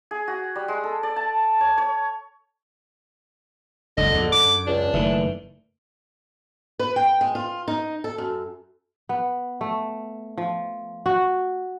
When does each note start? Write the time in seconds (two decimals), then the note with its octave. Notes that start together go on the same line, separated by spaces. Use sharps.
0.11 G#4
0.28 F#4
0.56 G3
0.68 G#3
0.84 A4
1.03 D5
1.16 A5
1.61 C#5
1.78 C#5
3.97 F#1 C#2 D3 D#5
4.14 A#1 E2 G#2
4.32 F#2 D6
4.67 C#2 D4
4.93 F#1 D#3 E3 A3
6.79 B4
6.96 G5
7.21 G#3
7.35 F4
7.68 D#4
8.04 A4
8.18 F#2
9.09 B3
9.61 A3
10.38 F3
11.06 F#4